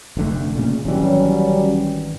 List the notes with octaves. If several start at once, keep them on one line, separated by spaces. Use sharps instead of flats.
F1 D3 A3
A#2 C#3
G#1 E3 F#3 G3 C#4